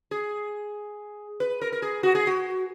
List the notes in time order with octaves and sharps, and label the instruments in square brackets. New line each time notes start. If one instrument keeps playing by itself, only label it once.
[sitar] G#4
B4
A#4
A#4
G#4
F#4
G#4
F#4